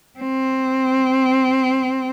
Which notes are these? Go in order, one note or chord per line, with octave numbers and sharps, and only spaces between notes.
C4